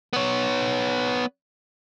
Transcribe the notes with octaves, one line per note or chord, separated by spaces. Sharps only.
B3 C#5